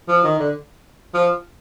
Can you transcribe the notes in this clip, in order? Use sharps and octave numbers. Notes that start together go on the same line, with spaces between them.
F3
D#3
D3
F3